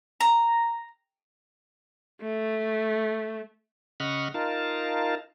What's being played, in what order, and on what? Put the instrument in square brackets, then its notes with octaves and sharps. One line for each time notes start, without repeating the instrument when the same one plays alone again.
[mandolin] A#5
[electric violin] A3
[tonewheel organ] C#3 D#5 F#5 B5 C#6 F6
D#4 F4 A#4 F5 A5